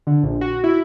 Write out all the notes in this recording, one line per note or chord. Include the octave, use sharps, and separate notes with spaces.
D3
A#1
F#4
E4